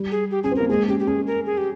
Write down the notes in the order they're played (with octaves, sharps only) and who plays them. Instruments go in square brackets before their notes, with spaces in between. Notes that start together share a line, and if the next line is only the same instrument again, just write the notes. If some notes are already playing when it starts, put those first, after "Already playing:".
Already playing: [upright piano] G3
[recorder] G#4
G4
[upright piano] C#4 [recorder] G#4
[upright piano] C4
[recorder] A#4
[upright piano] A#3
[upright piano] G#3 [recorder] G#4
[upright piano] C#4 [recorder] G4
[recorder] G4
[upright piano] C#4 [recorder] G#4
[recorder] A#4
G#4
G4